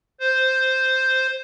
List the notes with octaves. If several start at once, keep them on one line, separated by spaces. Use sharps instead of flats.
C5